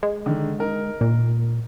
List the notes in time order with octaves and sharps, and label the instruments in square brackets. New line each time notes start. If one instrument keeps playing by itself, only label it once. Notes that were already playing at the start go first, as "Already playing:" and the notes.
[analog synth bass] G#3
[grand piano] D3 D#3
D#4 A#4
[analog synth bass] A#2